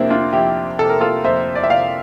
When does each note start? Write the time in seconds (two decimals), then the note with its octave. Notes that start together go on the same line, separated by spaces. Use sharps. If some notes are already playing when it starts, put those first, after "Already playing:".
Already playing: F2 C3 A#3 C4 D4 E4
0.10 D4 F4
0.33 F2 E4 G4
0.79 C3 A4
0.89 A#4
1.01 F4 A4
1.24 F2 C5 E5
1.55 D5
1.64 E5
1.70 C3 D5 F5